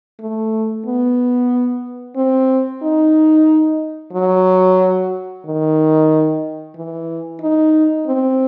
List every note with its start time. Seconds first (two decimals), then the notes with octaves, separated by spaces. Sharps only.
0.20 A3
0.86 B3
2.17 C4
2.83 D#4
4.13 F#3
5.45 D#3
6.75 E3
7.41 D#4
8.06 C4